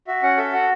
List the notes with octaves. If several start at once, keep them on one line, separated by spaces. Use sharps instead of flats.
F#4 E5
C#4 F#5
A4 E5
F#4 F#5